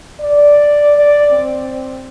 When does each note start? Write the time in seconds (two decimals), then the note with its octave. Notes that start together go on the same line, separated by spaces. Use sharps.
0.20 D5
0.96 D5
1.32 C4